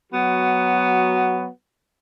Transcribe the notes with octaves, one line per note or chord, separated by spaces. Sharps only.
F#3 B3 F#4